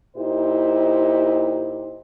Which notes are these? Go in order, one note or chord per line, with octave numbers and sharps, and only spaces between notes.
A#2 D#4 E4 G4 C5